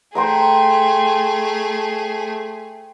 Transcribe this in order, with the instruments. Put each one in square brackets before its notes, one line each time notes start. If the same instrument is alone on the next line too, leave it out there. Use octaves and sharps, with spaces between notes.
[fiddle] A3 G#4 [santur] C5 G5 A#5